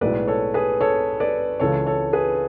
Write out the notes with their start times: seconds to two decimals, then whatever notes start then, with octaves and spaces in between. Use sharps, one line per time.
0.01 B1 A2 G#3 B4 D5
0.28 A4 C#5
0.54 G#4 B4
0.81 A4 C#5
1.20 B4 D5
1.60 C#2 C#3 E3 A4 C#5
1.87 A4 C#5
2.13 G#4 B4